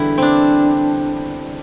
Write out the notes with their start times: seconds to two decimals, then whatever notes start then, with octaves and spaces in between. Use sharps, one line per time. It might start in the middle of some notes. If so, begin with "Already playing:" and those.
Already playing: E2 D3 G3 E4
0.18 C4 D4